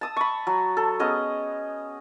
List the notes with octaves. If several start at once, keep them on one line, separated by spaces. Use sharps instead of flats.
A5 D#6 E6
B5 C#6
F#3
A4
B3 C#4 G#4 D#5